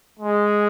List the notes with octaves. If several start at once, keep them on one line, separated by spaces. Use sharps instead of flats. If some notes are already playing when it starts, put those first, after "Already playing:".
G#3